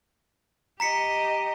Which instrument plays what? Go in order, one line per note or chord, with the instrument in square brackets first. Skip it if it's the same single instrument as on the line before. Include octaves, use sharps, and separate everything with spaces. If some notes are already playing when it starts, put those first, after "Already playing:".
[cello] G4 D#5 [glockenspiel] A#5 B6 C#7